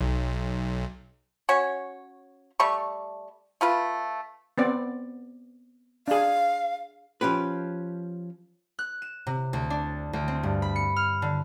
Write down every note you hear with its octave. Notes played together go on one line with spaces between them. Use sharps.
B1
C#4 F#4 C#5
G3 A3 C#6
A3 F4 B4
B3 C4 D5
D4 G#4 F5
F3 C#4 G4 B4
F#6
E7
C3
D2
D4
D2
C4
G2
B5
C#7
F6
D3